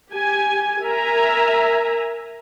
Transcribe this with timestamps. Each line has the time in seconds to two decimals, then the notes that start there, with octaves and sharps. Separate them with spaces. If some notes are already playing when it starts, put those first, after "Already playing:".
0.11 G4 G#5
0.84 A#4 E5 G#5 A#5